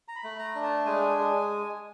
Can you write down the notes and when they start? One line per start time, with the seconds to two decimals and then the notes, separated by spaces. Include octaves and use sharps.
0.08 A#5
0.16 B5
0.24 A3
0.39 A#5
0.55 D4
0.63 A5
0.86 G#3 G#5
1.18 G#3